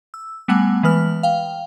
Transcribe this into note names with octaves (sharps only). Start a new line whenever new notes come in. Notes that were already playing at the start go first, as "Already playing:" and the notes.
E6
G3 A3 B3 F#5 G#5
E3 G#3 B4 F6
F5 G5